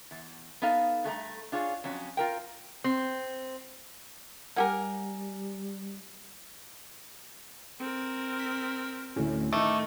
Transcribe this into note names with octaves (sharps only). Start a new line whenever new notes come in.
E2
B3 D#4 A4 F5
G2 A3 G#4 A#5
D4 F4 G#4 C#5
F2 F#3 C#4
F4 A#4 G5
C4
G3 A#3 G4 A#4 F#5 G#5
C4 A#4
B6
D2 A2 C#4
D#3 A3 D#4 D6